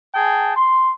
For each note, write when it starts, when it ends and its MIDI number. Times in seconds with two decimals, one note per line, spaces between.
0.15 0.54 68
0.15 0.54 79
0.15 0.54 81
0.56 0.92 84